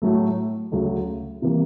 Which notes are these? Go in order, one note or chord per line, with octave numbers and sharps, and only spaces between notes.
A2 F#3 A3
D2 C#3 F#3
C3 E3 G3 A#3